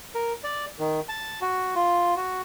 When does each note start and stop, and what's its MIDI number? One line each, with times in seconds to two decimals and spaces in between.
0.15 0.33 70
0.44 0.65 74
0.79 1.00 51
1.09 1.40 81
1.42 1.75 66
1.75 2.14 65
2.16 2.42 66